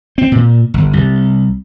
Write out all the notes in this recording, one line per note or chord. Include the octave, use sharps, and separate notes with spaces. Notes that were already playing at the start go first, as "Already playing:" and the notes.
C4
A#2
G1
C2